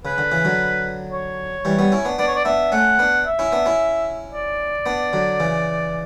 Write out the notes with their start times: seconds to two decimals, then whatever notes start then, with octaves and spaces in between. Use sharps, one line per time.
0.05 C#3 B4
0.18 D3
0.31 C#3 E3
0.45 D3 F#3
1.12 C#5
1.65 E3 G3
1.79 G3 B3
1.92 C#4 E4
2.05 B3 D4
2.18 B3 D4 D5
2.27 C#5
2.36 D5
2.45 B3 D4 E5
2.72 A3 C#4 F#5
2.99 B3 D4
3.26 E5
3.39 C#4 E4
3.52 B3 D4
3.66 C#4 E4
4.33 D5
4.86 B3 D4
5.13 D3 F#3
5.40 C#3 E3